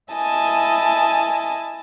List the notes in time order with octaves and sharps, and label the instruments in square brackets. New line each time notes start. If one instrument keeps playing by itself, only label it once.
[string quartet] E4 D#5 G#5 A5